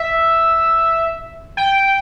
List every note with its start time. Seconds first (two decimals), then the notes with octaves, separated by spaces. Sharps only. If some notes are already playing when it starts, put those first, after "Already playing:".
Already playing: E5
1.57 G5